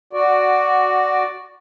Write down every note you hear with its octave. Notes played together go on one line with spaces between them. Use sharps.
F#4 D5